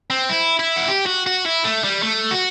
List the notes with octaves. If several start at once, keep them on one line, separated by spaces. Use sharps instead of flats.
C4
E4
E4
F#4
G4
F#4
F#4
E4
A3
G3
A3
F#4